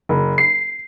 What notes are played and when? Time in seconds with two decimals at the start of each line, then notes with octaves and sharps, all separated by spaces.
0.09 F#1
0.38 C7